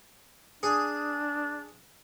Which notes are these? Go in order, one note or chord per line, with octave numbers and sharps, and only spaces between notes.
D4 G#4